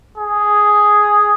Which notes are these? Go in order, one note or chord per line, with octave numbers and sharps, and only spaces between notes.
G#4